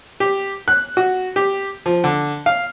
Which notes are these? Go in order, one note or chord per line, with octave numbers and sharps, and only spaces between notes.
G4
F#6
F#4
G4
F3
D3
F5